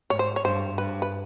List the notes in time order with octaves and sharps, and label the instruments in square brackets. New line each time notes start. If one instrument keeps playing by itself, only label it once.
[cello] G#2 [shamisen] C#5
[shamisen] C5
C#5
[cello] G2 [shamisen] C5
[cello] G2 [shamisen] B4
[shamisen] B4